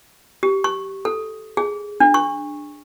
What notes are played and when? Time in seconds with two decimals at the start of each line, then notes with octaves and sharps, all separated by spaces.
0.43 G4
0.64 C#6
1.05 A4
1.57 G#4
2.00 D4
2.14 C#6